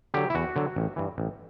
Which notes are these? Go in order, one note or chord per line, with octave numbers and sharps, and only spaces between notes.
D3 F#3 G4
E4
E2 F#4
D3 F#3
A1
G2 E3
A1